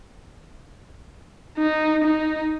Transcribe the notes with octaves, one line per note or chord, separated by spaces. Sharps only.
D#4
D#4